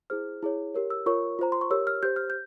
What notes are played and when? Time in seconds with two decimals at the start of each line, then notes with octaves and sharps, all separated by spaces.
0.10 E4 G#4 C5 F6
0.43 E4 G#4 C#5
0.74 G4 A#4 C#5
0.90 E6
1.06 F4 A#4 C#5 C#6
1.39 F4 C5 A#5
1.52 C6
1.61 C#6
1.71 G4 A#4 C#5 E6
1.87 F6
2.03 G4 C5 G6
2.16 F6
2.30 G6